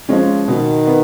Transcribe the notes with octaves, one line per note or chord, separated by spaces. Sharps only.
F3 G#3 C#4
B2 D#3
B3